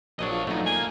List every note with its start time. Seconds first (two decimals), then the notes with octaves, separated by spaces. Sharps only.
0.19 A#1 F#3 D4 C#5 D#5
0.31 F4
0.47 F#2 E3 A3 D#4
0.66 A#3 G#5